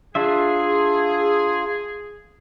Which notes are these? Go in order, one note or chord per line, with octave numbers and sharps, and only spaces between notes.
D4 F4 G#4 E5